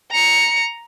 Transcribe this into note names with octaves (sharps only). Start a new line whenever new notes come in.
A#5 C#7